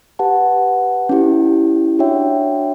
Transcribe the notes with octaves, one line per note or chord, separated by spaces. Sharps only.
G4 B4 F#5 A5
C#4 E4 G4
D4 F#4 C#5 E5 G5